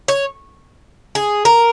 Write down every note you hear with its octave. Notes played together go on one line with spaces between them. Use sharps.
C#5
G#4
A#4